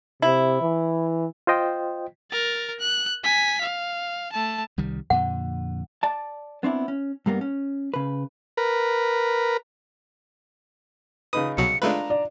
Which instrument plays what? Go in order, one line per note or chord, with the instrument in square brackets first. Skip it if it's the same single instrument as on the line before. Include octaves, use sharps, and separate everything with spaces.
[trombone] C3 [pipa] E4
[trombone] E3
[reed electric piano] F4 C5 D#5 G5
[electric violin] A#4 A6
F#6
G#5 B6
F5
A3 A5
[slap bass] C2 D#3 G3
[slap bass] F2 A#2 D3 [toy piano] F#5
[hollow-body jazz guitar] D5 A5
B3 C4 D4 E4
C#4
G2 G3 A#3 B3
C#4
C#3 B4
[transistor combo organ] A#4 B4
[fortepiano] C#3 D#4 B4 [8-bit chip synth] D#6
[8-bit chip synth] C2 B2 F#3 [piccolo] C#7
[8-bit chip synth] G#3 A3 B4 [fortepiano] D4 F4 [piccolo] A#5
[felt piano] D5